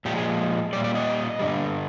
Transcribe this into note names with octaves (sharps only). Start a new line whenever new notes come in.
A#2 F3 G#3 G4
G#4
A#2 G3 D5
D5
D#5
G2 D3 G3